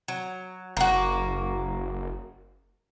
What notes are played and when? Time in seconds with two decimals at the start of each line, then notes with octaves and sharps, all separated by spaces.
0.08 F#3
0.77 F#1 A#3 F#4